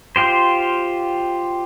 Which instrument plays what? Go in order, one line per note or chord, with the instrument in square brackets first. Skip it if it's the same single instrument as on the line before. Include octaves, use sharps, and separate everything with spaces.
[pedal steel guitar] F4 G4 C5